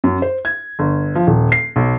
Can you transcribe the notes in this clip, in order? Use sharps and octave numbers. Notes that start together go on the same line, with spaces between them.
F#2
C5
G#6
G1
F3
D#1
C7
B1